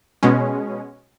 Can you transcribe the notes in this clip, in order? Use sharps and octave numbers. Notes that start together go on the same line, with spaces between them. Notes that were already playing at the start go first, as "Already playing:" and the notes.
B2 G#3 C#4